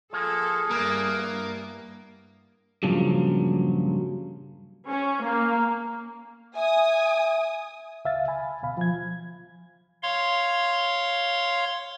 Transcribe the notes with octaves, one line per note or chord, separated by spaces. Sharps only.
F3 A#3 G#4 A4
G2 A#3 B3 E4 A#4
G2 A#2 C#3 F3 F#3
C#4
A#3
E5 G#5 D#6
C#2 E5 F5 A6
G#5 B5
D2 B2 F5 B5
F3 G#6
C#5 F5 C6